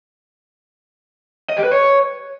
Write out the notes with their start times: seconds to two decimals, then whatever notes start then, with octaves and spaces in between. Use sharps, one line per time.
1.50 D#5
1.57 G4
1.64 B4
1.71 C#5